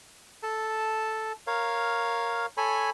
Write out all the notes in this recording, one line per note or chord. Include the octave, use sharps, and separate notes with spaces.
A4 A5
A#4 C#5 F5
A4 C#5 G#5 B5